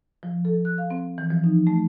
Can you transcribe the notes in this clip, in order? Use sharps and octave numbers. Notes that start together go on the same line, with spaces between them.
F3
A4
F#6
F5
C4
E3
F3
D#4
A3